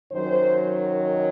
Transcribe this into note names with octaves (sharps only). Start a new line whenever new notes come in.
F#2 D#3 F#3 C5